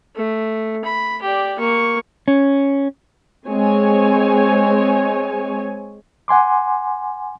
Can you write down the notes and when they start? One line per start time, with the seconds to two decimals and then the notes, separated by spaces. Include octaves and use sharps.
0.16 A3
0.84 B5
1.22 G4 D5
1.59 A#3 C#6
2.28 C#4
3.48 G#3 C4 C#5 G#5
6.28 F#5 G#5 C6 D6